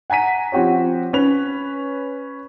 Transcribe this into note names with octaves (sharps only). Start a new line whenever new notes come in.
F#5 G#5 A#5 B6 D#7
F3 C4 F#4 G4 C#5
C#4 B4 F7